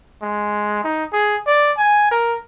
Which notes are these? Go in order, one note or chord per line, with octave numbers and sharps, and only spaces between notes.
G#3
D#4
G#4
D5
G#5
A#4